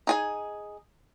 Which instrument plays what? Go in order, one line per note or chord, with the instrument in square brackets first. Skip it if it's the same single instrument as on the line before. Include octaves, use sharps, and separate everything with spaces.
[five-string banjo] D#4 G#4 G#5